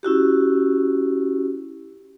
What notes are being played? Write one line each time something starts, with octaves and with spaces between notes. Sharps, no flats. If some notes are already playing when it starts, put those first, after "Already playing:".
C#4 E4 F#4 G4